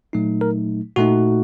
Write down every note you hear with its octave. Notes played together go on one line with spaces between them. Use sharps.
A#2 F#3 A3 D#4
A#4
A#2 A3 D#4 F#4